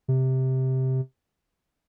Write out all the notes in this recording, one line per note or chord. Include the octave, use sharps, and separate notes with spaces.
C3